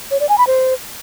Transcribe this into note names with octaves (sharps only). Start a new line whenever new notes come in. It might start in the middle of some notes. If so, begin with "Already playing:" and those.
C#5
D5
G#5
B5
C5